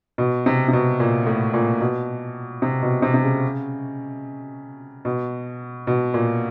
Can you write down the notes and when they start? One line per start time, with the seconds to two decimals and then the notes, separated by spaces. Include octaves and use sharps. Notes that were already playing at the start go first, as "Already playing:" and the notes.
0.18 B2
0.46 C3
0.68 C3
0.73 B2
1.00 A#2
1.27 A2
1.54 A#2
1.81 B2
2.62 C3
2.82 B2
3.02 C3
3.14 C3
3.24 C#3
5.05 B2
5.87 B2
6.14 A#2